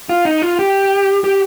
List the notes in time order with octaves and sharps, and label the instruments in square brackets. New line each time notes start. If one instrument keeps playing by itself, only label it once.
[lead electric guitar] F4
D#4
F4
G4
G4